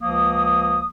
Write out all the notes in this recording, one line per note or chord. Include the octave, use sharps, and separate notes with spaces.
C#2 F3 A#3 D#6